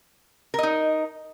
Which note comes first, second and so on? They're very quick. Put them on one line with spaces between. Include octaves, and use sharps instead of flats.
A#4 D#5 D#4